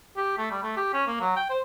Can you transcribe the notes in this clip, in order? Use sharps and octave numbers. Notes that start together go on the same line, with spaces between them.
G4
A3
G3
A3
G4
C#4
A#3
F#3
G5
C5